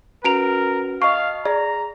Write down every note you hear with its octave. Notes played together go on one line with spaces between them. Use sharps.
C#4 F#4 A#4 B4 A#5 D7 F7
D#5 F5 A5 C#6 C7
G#4 D5 A#5